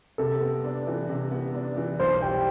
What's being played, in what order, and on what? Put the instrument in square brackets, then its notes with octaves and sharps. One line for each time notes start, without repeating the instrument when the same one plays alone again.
[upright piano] C3 [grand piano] A4
[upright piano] B3
D4
E3
C3
B3
D4
E3
[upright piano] B1 [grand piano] C5
[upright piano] G3 [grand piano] G5